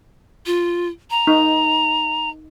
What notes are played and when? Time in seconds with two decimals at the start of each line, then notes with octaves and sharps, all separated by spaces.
0.46 F4
1.10 A#5
1.27 D#4